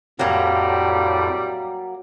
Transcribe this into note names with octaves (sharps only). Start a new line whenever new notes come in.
F2 A2 F#3 G3 A#3